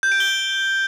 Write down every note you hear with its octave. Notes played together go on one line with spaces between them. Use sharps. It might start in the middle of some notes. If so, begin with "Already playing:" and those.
G6
D7
G7